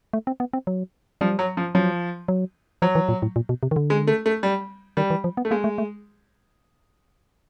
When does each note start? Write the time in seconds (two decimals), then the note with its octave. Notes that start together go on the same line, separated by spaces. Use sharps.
0.13 A3
0.27 C4
0.40 B3
0.53 C4
0.67 F#3
1.21 F3 G3
1.39 F#3
1.57 F3
1.75 F3 F#3
2.28 F#3
2.82 F3 F#3
2.95 E3
3.09 A#2
3.22 A2
3.36 A#2
3.49 B2
3.63 C3
3.71 D#3
3.76 D3
3.90 G#3
4.07 A3
4.26 A3
4.43 G3
4.97 D#3 G3
5.10 E3
5.24 F3
5.37 B3
5.45 A3
5.51 G#3 A#3
5.64 A3
5.78 A3